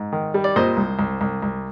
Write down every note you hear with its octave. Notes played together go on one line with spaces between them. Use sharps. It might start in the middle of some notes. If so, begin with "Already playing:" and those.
Already playing: G#2
D#3
G3
D5
A#2 C5 D#5
C2
C2
C2
C2